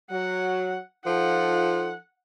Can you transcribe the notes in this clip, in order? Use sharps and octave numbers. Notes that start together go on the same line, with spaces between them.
F#3 F#5
F3 D#4 F4 A4 F#5